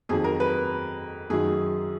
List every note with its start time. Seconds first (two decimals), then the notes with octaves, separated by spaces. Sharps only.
0.09 F2 D#3 F#3 G#4
0.24 A#4
0.40 B4
1.30 F#2 D#3 F#3 G#4